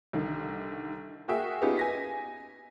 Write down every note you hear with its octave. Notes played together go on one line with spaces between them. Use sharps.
C2 D3 D#3
A#3 F#4 G#4 E5 G5
B3 C#4 D#4 F4 G4 G#4
G#5 A#6 B6